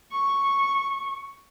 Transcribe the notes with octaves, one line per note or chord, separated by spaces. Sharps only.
C#6